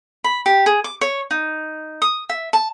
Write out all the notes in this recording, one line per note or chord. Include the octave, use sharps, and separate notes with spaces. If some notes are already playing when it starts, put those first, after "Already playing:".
B5
G4
G#4
D6
C#5
D#4
D#6
E5
A5